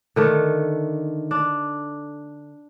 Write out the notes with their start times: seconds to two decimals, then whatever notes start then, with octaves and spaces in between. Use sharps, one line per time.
0.16 D3 D#3 A3
1.31 D4